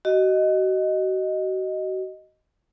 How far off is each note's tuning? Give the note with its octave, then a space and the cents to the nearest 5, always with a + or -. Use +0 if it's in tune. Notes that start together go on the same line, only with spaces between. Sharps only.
F#4 +35 D#5 +0